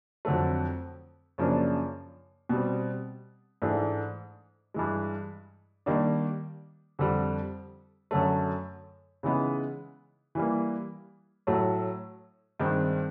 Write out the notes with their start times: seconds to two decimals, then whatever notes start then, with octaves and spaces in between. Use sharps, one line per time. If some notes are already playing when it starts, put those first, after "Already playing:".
0.25 F2 D3 F#3 A3
1.38 F#2 C#3 F3 A#3 D4
2.49 B2 G3 C4
3.62 G#2 E3 A3 D4
4.74 G2 E3 G#3
5.86 D#3 G3 A#3 D4
6.99 F2 D3 G3
8.11 F#2 D3 F#3 A3
9.23 C#3 E3 G#3 B3 D#4
10.35 E3 G3 A#3
11.47 A2 F#3 A3
12.59 G2 D#3 G#3 C4